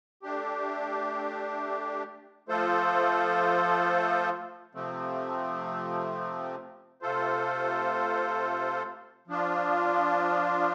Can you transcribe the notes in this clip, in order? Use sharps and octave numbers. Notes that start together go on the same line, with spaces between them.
A3 D4 G4
F3 A3 F4 A4 C5
C3 F3 A3 C4
C3 A3 F4 A4 C5
F3 D4 F4